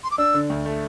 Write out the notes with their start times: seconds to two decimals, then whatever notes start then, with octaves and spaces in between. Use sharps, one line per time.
0.04 C6
0.11 D6
0.18 D4 E6
0.34 D3
0.50 D2
0.66 A3